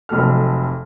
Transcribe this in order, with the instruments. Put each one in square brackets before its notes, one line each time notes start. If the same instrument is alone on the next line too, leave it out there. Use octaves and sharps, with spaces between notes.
[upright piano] F1 F2 F#3 A4 F6